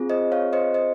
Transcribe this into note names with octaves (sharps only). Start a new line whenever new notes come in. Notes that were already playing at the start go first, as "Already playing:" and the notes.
Already playing: C4 F4 G#4
C5 D#5
C#5 F5
C5 D#5
C5 D#5